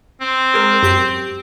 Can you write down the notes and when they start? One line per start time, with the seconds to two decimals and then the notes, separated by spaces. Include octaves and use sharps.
0.21 C4
0.54 G#3 A#4
0.83 F#2 G4 C7